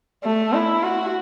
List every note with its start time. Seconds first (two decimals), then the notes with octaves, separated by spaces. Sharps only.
0.24 A3
0.53 E4
0.83 F#4